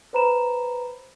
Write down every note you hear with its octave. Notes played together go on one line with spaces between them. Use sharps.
B4 C5 A#5 B5 E7